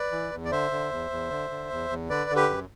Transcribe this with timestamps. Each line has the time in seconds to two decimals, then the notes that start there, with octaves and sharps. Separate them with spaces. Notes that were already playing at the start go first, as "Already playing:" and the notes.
Already playing: B4 D5
0.12 E3
0.32 E2
0.45 D5
0.51 D3 C5 E5
0.71 D3
0.91 E2
1.11 E2
1.30 D3
1.50 D3
1.70 E2
1.90 E2
2.09 D3 B4 D5
2.30 D3
2.36 G4 B4
2.50 F#2